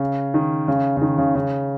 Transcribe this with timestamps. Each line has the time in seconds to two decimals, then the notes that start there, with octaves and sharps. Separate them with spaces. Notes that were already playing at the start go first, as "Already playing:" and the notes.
Already playing: C#3
0.34 D#3
0.68 C#3
0.97 C#3
1.02 D#3
1.18 C#3
1.35 C#3